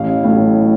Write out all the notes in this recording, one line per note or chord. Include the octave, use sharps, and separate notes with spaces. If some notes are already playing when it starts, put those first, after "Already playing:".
Already playing: A1 F5
A2 F#3